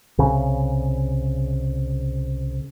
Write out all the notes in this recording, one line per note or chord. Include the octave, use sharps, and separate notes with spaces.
C2 C#3